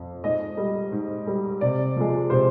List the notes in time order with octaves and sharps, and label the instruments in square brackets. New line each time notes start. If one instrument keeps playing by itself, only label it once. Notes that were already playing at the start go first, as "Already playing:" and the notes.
Already playing: [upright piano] F2
G#2 D#5
G3
G#2
G3
C3 D5
F3 G#3
C3 C5